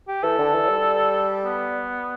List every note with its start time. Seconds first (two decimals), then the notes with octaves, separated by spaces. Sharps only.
0.08 G4
0.23 E3 A4
0.38 D3
0.54 E3
0.69 G3
1.45 B3